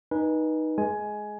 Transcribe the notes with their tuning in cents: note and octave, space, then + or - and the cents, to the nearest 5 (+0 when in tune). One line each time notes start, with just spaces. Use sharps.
D#4 +0 B4 -25 G#5 +0
G#3 +15 G#5 +15